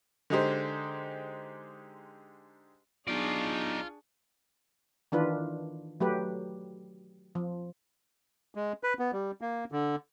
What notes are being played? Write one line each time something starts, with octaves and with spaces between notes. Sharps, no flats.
D3 G#3 D#4 G4 C5
B1 D4 D#4 F4 G#4 D5 C#6
D#3 E3 D4 F4 B4
F#3 A3 G4 B4
F3
G#3
B4
B3
G3
A#3
D3